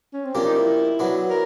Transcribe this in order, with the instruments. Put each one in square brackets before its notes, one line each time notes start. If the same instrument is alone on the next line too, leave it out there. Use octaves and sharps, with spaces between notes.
[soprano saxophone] C#4
C4
[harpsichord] F3 A#3 D4 G4 [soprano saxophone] C#4
[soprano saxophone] D#4
E4
[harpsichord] F#3 B3 D4
[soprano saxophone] A#4